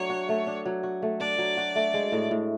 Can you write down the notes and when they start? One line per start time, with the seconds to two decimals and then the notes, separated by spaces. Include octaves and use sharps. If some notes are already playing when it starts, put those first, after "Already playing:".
Already playing: F#3 A3 D4 C#5
0.10 F#4
0.29 A3
0.47 D4
0.65 F#3
0.83 F#4
1.02 A3
1.20 D4 D5
1.38 F#3
1.57 F#4
1.75 A3
1.94 G#3
2.12 A2
2.31 A2